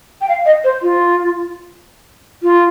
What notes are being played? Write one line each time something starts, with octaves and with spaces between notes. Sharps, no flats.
G5
F5
D#5
C5
F4
F4